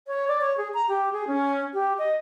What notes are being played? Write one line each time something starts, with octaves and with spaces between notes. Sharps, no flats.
C#5
D5
C#5
G#4
A#5
G4
G#4
C#4
G4
D#5